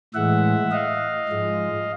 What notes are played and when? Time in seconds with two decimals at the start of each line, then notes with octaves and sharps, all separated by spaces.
0.14 A2 E3 G#3 E5 F#5
0.71 D#5 F5
1.29 G#2 F3 G#3